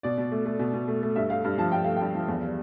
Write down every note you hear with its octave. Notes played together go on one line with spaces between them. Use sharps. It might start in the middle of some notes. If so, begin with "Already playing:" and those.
B2 D5
B2
A3
A3
B2
B2
A3
A3
G2 E5
A3 F5
G2
F3 A5
G2 G5
A3 F5
G2 G5
F3
E2
G3